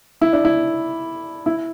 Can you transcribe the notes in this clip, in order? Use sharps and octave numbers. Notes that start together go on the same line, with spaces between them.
E4
D4
E4
E4